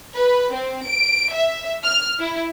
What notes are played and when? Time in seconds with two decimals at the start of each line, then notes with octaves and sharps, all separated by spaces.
0.14 B4
0.54 C4
0.88 D7
1.34 E5
1.84 F6
2.20 E4